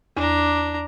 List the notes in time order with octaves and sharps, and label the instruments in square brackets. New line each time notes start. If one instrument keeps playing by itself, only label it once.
[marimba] E2 [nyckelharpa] D4 A#5